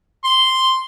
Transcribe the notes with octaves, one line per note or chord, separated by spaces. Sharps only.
C6